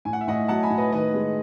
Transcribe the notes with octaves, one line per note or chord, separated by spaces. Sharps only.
A2 G#5
F#5
E5
A2 D#5 F#5
F#3 F#5 A5
G#5 B5
A2
B4 D#5
D#3 B4 D#5
G#3